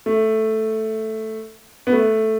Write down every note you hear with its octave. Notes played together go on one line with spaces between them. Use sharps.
A3
B3
A3